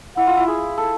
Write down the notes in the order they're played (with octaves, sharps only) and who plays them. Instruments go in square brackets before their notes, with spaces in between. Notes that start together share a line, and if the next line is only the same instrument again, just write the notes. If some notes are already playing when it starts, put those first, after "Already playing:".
[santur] E4 [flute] F#5
[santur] F4
E4
G#4
A4